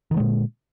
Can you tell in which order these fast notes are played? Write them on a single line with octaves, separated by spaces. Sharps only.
D#3 D3 G#3 A#2